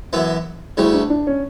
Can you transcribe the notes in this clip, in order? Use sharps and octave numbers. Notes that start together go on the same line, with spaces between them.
F#2 E3 B3
D2 C#3 G3 E4
D4
D4
C#4